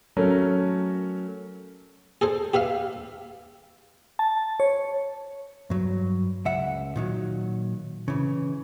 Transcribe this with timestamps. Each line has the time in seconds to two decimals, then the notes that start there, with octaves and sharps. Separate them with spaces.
0.17 F#3 A3 C#4 A#4
2.21 G#4 A4 C5
2.54 G4 B4 E5 F5
4.19 A5
4.60 C#5
5.70 G2 F#3
6.45 C#2 E5 F#5
6.96 A#2 D#3 F#3
8.08 C#3 E3